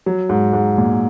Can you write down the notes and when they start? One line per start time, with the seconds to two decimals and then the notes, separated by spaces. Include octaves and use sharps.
0.06 F#3
0.29 G#2
0.53 G#2
0.78 A#2